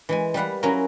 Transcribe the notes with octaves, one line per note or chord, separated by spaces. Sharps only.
E3 G#3 G#5
G3 B4 F5 F#5
F#3 C#4 E4 F4 A#4